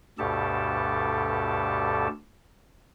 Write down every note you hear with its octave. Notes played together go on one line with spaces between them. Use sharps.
D2 G2 B2 G4 A4 A5